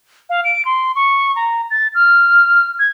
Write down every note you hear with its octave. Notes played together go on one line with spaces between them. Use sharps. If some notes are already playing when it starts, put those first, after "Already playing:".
F5
D7
C6
C#6
A#5
A6
F6
G#6